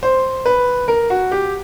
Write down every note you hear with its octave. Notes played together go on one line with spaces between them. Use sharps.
C5
B4
A#4
F#4
G4